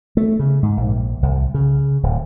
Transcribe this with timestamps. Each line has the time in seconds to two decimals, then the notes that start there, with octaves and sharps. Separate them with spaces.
0.17 A3
0.39 C#3
0.63 G#2
0.77 A#1
1.23 C2
1.54 C#3
2.03 D1